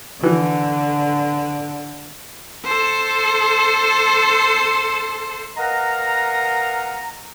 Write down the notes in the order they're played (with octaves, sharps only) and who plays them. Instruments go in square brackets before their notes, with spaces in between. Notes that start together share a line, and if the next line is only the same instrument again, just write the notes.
[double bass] D3 [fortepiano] E3
[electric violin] A4 C5
[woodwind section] A#4 B4 D#5 F5 F#5 A#5